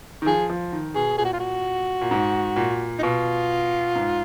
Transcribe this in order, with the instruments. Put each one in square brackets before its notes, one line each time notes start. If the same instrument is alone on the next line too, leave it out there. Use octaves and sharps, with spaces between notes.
[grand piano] D#3
[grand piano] F3 [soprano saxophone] G#4
[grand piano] F3
D#3
[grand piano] B2 [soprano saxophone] G#4
[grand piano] A#2 [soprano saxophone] G#4
[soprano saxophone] F#4
F4
F#4
[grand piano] A#2
G#2
A#2
[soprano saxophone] D#4
[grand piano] B2 [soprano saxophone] F4
[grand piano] G#2